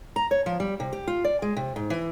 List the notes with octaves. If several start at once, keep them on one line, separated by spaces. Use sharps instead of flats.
A#5
C#5
F3
G3
C3
G4
F4
D5
G#3
C3
G#2
E3